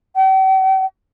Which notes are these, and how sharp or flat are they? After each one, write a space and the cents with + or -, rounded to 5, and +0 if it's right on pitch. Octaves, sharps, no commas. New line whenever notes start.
G5 -45